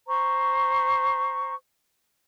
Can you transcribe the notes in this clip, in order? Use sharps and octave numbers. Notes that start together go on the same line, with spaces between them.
C5 A#5 C#6